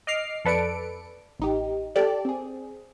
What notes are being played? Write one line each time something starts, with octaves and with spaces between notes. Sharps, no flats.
D#5 D6 F6 C7
F2 A4 B4 D5 C#7 D7
A1 D#4 G4
G4 A4 D5
C4 G#4